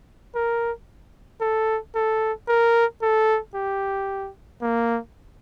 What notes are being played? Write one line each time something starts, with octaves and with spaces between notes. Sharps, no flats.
A#4
A4
A4
A#4
A4
G4
A#3